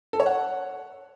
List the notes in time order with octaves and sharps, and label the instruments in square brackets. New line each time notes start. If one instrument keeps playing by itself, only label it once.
[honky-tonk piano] A4
C#5
F#5